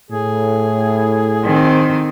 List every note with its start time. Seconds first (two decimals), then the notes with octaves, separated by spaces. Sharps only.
0.11 A2 G#4
1.45 D#3 C4